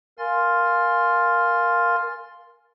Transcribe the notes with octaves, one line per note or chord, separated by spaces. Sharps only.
A#4 F5 G#5 C6 F6 A6